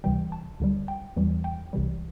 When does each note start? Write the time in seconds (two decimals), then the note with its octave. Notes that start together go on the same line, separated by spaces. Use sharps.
0.04 D2 C3 E3 G3 G5
0.32 A5
0.60 D2 D3 G3
0.88 G5
1.17 E2 E3 G3
1.44 G5
1.73 C2 C3 E3 G3